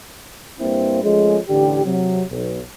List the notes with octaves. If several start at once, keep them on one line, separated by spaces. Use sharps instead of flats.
G2 A#3 C4 E4 C5
F3 G#3 A3 C#4 G#4
A1 D3 G4
C3 F#3
B1